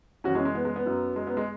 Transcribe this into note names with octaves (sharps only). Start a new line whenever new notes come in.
F#2 E3 C#4 F#4
G#3 C#4
G#3
B3
G#3
B3
F#2 F#3
G#3
B3
G#3